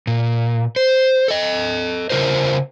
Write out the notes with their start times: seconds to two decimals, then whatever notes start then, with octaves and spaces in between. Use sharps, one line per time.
0.07 A#2
0.76 C5
1.28 A4 D#5
2.10 C#3 E3 F4 A#4 C5